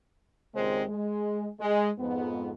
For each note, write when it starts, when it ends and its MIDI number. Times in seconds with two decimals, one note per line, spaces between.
0.54 0.83 39
0.54 0.83 46
0.54 0.83 49
0.54 0.83 56
0.54 0.83 60
0.54 0.83 72
0.88 1.48 56
1.59 1.89 56
1.98 2.51 41
1.98 2.51 44
1.98 2.51 59